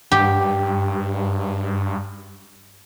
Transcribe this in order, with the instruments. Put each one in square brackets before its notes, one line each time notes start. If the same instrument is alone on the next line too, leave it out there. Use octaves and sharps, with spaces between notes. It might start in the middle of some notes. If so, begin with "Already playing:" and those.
[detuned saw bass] G2 [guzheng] G4